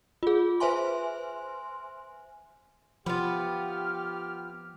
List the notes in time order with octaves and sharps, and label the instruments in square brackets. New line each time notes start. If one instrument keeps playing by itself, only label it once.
[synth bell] F4 G#4
B4 C5 E5 G#5 C6
[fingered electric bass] F3 [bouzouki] B3 F4 [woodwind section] G4 F6